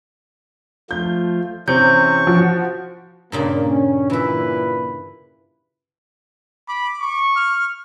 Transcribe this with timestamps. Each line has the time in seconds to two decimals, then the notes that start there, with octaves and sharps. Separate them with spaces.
0.91 F3 A3 F4 G6
1.68 C3 E3 C#4 C5 C#6 G6
2.27 F3 F#4
3.32 G2 A#2 C#3 A#3
3.67 C#4
4.10 A#2 E3 E4 B4 E5
6.68 B5 D6
7.00 C#6
7.36 F6